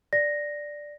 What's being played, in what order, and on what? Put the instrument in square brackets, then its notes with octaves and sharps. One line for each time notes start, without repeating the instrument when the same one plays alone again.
[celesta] D5 A#6